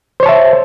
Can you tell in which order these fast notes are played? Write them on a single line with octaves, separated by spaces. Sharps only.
C5 C#5 A5 E5